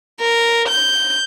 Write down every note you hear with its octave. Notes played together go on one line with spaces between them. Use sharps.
A#4
G6